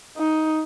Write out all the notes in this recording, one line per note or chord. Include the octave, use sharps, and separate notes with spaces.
D#4